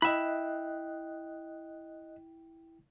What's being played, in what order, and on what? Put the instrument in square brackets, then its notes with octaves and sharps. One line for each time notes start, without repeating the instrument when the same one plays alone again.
[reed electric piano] E4 G5 [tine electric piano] D#5 F#6 [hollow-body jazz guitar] E5 B5